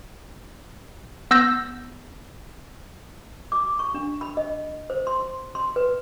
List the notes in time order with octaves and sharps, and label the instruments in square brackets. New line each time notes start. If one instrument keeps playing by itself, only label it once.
[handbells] B3 E6 G6 A#6
[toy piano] D6
C#6
D4
B5
D#5
C5
C6
C6
B4